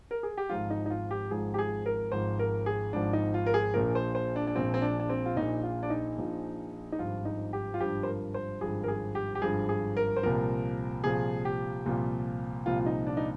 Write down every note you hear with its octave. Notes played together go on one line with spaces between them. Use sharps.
A#4
G#4
G4
G#1 G#2 F3 F4
D#4
D#4
F4
G4
G#1 G#2 F3 G#4
G4
G#4
A#4
G#1 G#2 F3 C5
A#4
G#4
G#1 G#2 F3 D4
D#4
F4
A#4
G#4
A#1 A#2 F3 A#4
C5
C5
D4
D4
A#1 A#2 F3 C4
C4
D4
D4
C4
F4
A#1 A#2 F3 D#4
F4
D4
D#4
A#1 A#2 F3
D#4
G#1 G2 F3 F4
D#4
G4
F4
G#1 G2 F3 G4
C5
A#4
C5
G#1 G2 F3 G#4
A#4
G#4
G4
G4
G#1 G2 F3 G#4
G#4
A#4
C5
C2 A#2 F3 A#4
C2 A#2 F3 G#4
G4
C2 A#2 F3
C2 A#2 F3 F4
F4
D#4
D4
D#4